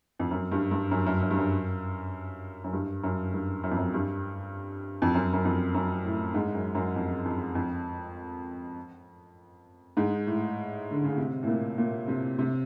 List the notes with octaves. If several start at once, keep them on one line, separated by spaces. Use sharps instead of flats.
F2
F#2
G2
G2
F#2
F#2
F#2
G2
F#2
F#2
G2
F#2
G2
F#2
F2
F#2
G2
F2
F#2
F#2
F2
F#2
A2
G#2
F#2
F#2
F2
F2
F2
G#2
A2
D3
C#3
C3
A2
A#2
A#2
C3
C3